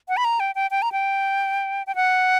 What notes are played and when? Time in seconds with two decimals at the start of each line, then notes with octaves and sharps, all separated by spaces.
0.09 F#5
0.17 B5
0.25 A#5
0.40 G5
0.55 G5
0.71 G5
0.82 A#5
0.92 G5
1.87 G5
1.95 F#5